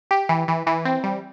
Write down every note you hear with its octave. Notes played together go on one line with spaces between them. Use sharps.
G4
E3
E3
E3
C4
G3